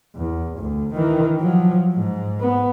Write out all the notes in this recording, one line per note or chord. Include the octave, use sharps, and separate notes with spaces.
E2
D2
D#3 E3
F3 F#3
G#2
B3